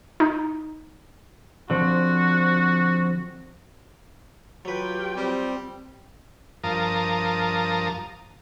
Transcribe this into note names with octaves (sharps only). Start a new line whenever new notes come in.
D#4
D3 F3 C4 F#4
F#3 F4 G4 B4 G5
G3 C4
G2 F3 A#4 A5 A#5 D#6